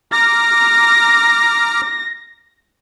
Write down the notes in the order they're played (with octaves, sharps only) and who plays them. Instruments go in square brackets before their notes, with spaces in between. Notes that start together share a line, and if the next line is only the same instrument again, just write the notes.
[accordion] A#5 D6 F6 [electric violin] A#6